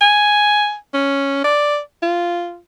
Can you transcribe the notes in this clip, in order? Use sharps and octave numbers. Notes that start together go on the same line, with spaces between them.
G#5
C#4
D5
F4